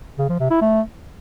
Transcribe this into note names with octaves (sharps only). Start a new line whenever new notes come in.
C#3
F3
C3
E4
A3